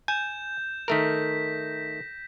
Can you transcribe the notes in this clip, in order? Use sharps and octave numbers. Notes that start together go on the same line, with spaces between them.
G#5 G6 E7
D#3 A3 A#4 A#6 B6